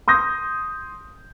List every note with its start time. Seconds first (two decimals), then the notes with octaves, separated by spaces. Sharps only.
0.08 C6 D#6 G6 A#6